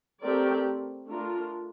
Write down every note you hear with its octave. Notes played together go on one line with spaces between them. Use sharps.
A3 C4 G4 A#4 D5
A3 D4 F4 A#4